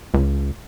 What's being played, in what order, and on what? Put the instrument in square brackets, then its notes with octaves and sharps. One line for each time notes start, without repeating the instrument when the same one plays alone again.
[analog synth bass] C#2